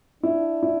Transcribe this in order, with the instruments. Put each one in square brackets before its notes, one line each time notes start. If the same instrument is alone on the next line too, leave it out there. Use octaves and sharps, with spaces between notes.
[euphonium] D4 [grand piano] E4
[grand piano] E4